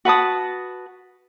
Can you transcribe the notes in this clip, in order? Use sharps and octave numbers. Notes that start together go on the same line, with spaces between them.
F#4 B4 A5 D#6